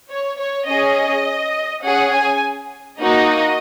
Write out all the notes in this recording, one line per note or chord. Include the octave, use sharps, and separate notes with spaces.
C#5
C#5
C#4 G#4 D#5
C#4 G#4 F#5
G#5
A#3 D#4 F#4 D#5